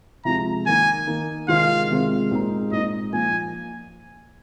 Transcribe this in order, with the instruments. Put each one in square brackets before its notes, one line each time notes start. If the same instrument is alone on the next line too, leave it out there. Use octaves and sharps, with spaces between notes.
[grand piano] C3 F3 G#3 F4 [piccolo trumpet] A#5
[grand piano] D#3 A#3 D#4 [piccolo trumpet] G#5
[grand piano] D#3 A#3 D#4
[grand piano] C3 D#3 G#3 C4 F4 [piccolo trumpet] F5
[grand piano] C3 D#3 G#3 C4 F4
A#2 G#3 C4 D#4
[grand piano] A#2 G#3 C4 D#4 [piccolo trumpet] D#5
[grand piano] A#2 F3 A#3 [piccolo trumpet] G#5